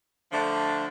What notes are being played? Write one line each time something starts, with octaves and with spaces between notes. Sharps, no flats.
D3 F3 A3 D4